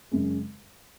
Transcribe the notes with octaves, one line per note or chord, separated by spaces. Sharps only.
F#2 C#3 G#3